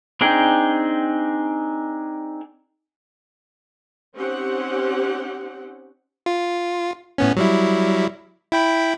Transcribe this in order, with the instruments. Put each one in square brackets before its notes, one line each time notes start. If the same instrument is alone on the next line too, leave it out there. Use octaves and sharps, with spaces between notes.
[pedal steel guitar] C4 D4 D#4 G#4 G5
[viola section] C4 C#4 D#4 G4 C5 F#5
[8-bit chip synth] F4
A2 B3 C#4
F#3 G3 E4
E4 G5 B5